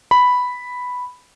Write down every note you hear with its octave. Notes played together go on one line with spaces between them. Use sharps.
B5